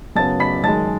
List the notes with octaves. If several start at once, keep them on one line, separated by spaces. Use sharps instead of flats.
F#2 C#3 F#3 B3 A5 A6
B5 B6
F#2 D#3 G#3 A5 A6